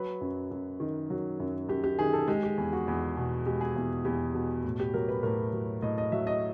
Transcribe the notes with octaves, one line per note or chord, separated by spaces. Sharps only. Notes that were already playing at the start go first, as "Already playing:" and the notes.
Already playing: F#3 B4
F#2
F#2
D#3
F#3
F#2
F#2 G4
G4
D#3 G#4
A4
G#3 G4
G4
E2 G#4
F#4
E2
B2
G#3 G4
G#4
E2
E2 G4
B2
A2
G4
F#3 A#4
B4
A2 A#4
F#3
A2 D#5
D#5
F#3 E5
D#5